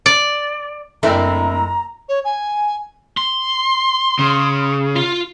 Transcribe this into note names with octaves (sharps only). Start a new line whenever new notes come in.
D5
F#1 A3 C4 D4 E4 A#4 G5 A#5
C#5
G#5
C6
C#3
F4